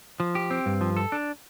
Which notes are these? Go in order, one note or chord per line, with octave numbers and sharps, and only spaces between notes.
F3
G4
C4
G2
F3
A4
D4